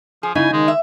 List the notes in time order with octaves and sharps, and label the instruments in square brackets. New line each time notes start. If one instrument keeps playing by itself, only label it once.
[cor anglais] F3 [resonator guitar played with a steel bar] G#4
[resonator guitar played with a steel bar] C#3 [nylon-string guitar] D#4 [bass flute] E4 [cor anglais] G#5
[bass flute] D#3 [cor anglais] G#3
[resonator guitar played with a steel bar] E5